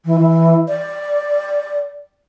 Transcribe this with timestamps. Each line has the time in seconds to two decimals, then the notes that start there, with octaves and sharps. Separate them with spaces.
0.05 E3
0.19 E3
0.68 D5